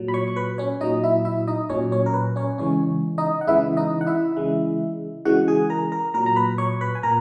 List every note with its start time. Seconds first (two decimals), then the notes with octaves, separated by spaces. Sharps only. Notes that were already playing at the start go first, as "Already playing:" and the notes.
Already playing: A#2 F#3
0.08 B5
0.14 C#5 C#6
0.28 C#6
0.36 B4 B5
0.58 C#4 C#5
0.81 A#2 F#3 D#4 D#5
1.03 E4 E5
1.25 E4 E5
1.48 D#4 D#5
1.69 A#2 F#3 C#4 C#5
1.92 C#4 C#5
2.06 A#4
2.14 B4
2.36 C#4 C#5
2.58 C#3 E3 G#3 C#4 C#5
3.18 D#4 D#5
3.41 F#5
3.47 C#3 E3 G#3 E4 E5
3.77 D#4 D#5
4.01 F#5
4.07 E4 E5
4.37 C#3 E3 G#3
5.25 C#3 E3 G#3 F#4 F#5
5.48 G#4 G#5
5.70 A#4 A#5
5.92 A#4 A#5
6.14 A#2 F#3 A#4 A#5
6.26 A#5
6.36 B4 B5
6.58 C#5 C#6
6.81 B4 B5
6.95 G#5
7.03 A#2 A#4 A#5